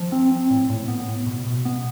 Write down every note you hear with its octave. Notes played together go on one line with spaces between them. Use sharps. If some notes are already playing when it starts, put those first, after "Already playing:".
Already playing: F3
C4
C4
A2
A2
B3
A2
B2
B2
B3